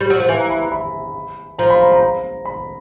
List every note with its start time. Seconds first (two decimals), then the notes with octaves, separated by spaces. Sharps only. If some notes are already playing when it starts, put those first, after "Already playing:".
0.01 G3
0.10 F#3
0.20 F3
0.29 E3 G#5
0.39 A#5
0.50 B5
0.61 A#5
0.72 B5
1.58 F3 A#5
1.70 B5
1.81 A#5
1.92 A#5
2.02 A#5
2.45 B5